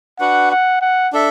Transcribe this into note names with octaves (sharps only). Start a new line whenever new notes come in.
D4 F#4 B4 F#5
F#5
F#5
D4 A4 E5